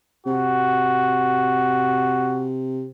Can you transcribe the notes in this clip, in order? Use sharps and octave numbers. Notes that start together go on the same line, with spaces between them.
C3 F#4